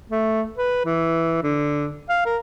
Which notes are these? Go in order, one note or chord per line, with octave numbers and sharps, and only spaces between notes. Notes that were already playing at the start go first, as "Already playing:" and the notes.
A3
B4
E3
D3
F5
A#4